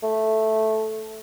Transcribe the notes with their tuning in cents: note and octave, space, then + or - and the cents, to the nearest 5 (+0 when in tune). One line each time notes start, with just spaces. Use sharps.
A3 -5